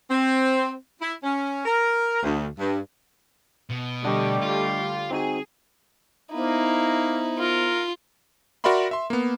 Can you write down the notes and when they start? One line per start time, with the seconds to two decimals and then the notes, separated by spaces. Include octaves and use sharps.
0.11 C4
1.00 E4
1.23 C#4
1.66 A#4
2.22 D2
2.59 G2
3.70 B2
4.05 D3 G3 A3 D4 G4 D#5 C#6
4.42 F4
5.11 C4 D#4 F#4 G#4
6.34 A#3 B3 D#4 E4 C5
7.38 F4 A#4
8.64 F#4 A#4 D5 E5 B5 C6
8.91 E5 C6
9.10 A#3 B3